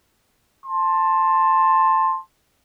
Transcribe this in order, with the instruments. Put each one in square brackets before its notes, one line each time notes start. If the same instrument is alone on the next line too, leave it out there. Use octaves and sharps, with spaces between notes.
[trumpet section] A5 C6